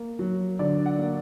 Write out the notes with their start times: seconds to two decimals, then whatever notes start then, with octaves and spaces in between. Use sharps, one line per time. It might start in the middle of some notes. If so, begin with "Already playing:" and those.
Already playing: A#3
0.19 F#3
0.59 D3 D5
0.86 F#5
0.99 A#3